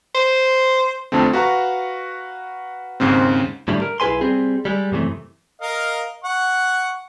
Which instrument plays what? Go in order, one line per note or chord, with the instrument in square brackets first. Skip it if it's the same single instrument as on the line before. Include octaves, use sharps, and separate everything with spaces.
[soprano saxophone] C5
[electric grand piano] F2 D3 A3 C4
F#4 B4 F5 F#5 A#5 C#6
D#2 G#2 C#3 C4
[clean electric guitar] A2 D3 G3 A3
A#4
B1 E4 G#4 B4 G#5 C6
G3 C4 G#4
G3 G#3
F#2 C3 E3 A3
[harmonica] A#4 D#5 F5
F#5 C#6